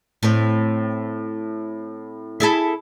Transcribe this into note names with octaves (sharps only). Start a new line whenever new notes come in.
A2 C4
E4 G#4 A4